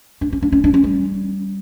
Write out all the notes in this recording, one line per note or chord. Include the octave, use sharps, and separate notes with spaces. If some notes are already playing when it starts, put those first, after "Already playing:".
D4
C#4
D4
C#4
D4
C#4
G3